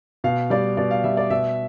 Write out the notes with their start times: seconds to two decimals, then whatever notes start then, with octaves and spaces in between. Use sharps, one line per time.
0.24 B2 F5
0.50 G3 D5
0.77 B2 D5
0.91 F5
1.04 G3 E5
1.17 D5
1.30 B2 E5